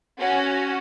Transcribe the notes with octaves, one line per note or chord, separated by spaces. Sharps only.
C#4 F#4